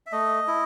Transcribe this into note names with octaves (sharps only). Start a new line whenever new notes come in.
E5
A3 D#5
E4